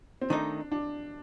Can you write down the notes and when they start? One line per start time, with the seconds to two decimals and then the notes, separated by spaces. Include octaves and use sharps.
0.21 C4
0.30 D#3 A3 D4 D#4
0.72 D4